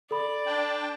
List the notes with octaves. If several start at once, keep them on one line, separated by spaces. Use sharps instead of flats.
A4 D5 B5
D4 G5 A5